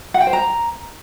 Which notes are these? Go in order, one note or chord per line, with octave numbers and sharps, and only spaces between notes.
F#5
G5
C5
A#5